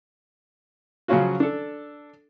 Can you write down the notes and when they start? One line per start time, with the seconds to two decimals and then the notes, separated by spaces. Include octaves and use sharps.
1.08 C#3 F3 F#3 C#4 F4 F#4
1.40 D4 A4